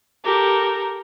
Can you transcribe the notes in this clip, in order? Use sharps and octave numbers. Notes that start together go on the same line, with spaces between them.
G4 A4 A#4